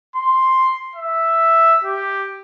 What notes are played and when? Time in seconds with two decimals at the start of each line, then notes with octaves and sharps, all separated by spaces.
0.16 C6
0.96 E5
1.84 G4